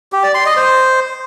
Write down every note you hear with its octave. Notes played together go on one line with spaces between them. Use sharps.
G4
D5
C6
D#5
C5